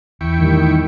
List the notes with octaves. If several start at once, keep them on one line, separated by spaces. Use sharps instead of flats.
E2 E4 G5 C#6
A2 D#3 G3